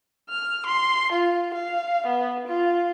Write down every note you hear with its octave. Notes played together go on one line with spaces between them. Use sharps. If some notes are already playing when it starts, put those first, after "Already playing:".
F6
C6
F4
F5
B3
F4